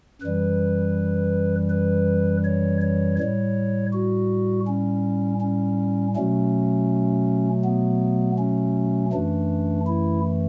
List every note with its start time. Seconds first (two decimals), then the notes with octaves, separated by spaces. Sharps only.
0.22 F#2 E3 G3 B4
1.70 B4
2.44 C#5
2.81 C#5
3.19 A2 G3 C#5
3.93 F#4
4.68 C#4
5.41 C#4
6.16 B2 F#3 A3 C#4
7.65 B3
8.39 C#4
9.13 F#2 E3 A3 D4
9.87 E4